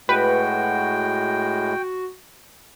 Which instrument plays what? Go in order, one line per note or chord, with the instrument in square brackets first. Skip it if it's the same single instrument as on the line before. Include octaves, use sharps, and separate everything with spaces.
[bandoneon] A2 G#3 [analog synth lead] F#4 [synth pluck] B4 [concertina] G5